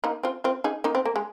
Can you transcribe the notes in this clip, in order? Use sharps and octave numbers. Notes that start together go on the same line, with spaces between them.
A#3 D#4
C4 F4
C4 F4
D#4 G#4
A#3 D#4
C4
A#3
G#3